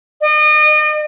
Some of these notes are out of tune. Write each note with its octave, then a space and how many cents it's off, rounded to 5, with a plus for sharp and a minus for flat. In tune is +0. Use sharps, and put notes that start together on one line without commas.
D#5 -40